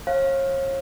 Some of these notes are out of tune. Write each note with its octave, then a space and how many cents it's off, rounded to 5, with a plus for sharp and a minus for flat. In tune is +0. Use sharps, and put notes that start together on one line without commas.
C#5 -40 F5 +0